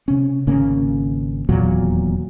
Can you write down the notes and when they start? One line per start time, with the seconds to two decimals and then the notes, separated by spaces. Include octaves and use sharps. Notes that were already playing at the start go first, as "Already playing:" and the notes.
0.08 C3 C#4
0.47 G#1 C#3 A#3 C#4
1.49 D#1 E2 A#2 F#3